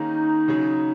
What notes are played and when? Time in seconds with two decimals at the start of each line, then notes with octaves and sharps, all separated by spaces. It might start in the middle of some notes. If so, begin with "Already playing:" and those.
Already playing: D#3 A#3 C#4 D#4 G#4
0.48 C#3 F#3 C#4 G#4 C#5